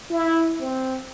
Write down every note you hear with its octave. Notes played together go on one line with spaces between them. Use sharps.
E4
C4